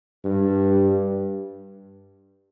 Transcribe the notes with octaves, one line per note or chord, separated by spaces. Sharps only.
G2